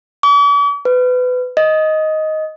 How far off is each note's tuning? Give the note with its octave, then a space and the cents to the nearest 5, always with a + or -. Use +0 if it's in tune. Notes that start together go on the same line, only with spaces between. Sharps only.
D6 -45
B4 +25
D#5 +5